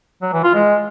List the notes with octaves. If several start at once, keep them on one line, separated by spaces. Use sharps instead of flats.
F#3
E3
F4
G#3